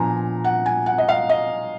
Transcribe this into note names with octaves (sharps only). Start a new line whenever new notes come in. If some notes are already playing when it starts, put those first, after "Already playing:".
Already playing: A#2 F3 B3 D4 G#5 A#5
F#5
G#5
F#5
D#5
F5
D#5